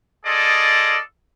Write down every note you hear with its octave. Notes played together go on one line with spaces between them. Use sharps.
F4 G#4 A4 D5 D#5